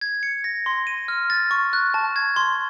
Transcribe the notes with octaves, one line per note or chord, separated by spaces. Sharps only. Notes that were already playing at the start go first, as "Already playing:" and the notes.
G#6
C#7
A#6
C6
D#7
F6
A6
C#6
F#6
A5
G#6
C6